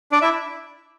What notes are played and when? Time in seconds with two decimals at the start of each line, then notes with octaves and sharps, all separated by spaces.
0.12 D4 D5
0.22 E4 E5